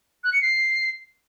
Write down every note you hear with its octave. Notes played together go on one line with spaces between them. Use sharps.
F#6
C#7
C7